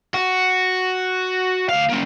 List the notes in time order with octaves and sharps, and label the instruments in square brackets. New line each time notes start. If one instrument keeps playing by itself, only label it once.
[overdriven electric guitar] F#4
D2 F5
A#3 C#4